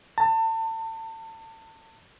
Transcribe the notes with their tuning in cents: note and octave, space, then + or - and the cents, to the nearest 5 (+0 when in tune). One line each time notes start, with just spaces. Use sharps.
A5 +35